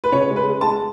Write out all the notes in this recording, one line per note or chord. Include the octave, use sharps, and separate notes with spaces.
B4
C#3 C#5
G#3
B4
G#3
A5
G#3